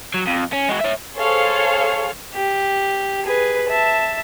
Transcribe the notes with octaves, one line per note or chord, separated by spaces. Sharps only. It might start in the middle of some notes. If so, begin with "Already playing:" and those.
F#3
F2
C#4
G#3 F#4
C#5 E5
G#4 A4 C5 C#5 F5
G4
G#4 B4
E5 A5